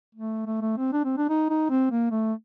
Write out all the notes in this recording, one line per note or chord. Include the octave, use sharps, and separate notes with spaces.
A3
A3
A3
C4
D4
C4
D4
D#4
D#4
C4
A#3
A3